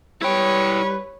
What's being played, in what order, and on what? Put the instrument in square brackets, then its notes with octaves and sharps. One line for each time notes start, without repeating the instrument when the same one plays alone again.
[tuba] G3 [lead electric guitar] E4 G5 [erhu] B4 [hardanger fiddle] C#5